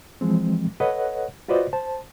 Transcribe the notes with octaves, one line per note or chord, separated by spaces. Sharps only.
E3 F3 G#3 C4
A4 B4 C#5 D#5 F#5
F4 F#4 B4 C5 D5 D#5
C5 A5